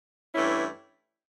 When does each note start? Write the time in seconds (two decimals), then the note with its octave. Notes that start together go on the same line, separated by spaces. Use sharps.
0.33 G2 E3 A3 C#4 E4